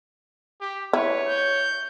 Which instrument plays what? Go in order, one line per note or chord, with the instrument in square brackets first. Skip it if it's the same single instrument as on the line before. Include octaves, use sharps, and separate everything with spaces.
[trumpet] G4
[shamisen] E4 [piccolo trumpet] B4 [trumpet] C#5
[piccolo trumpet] G6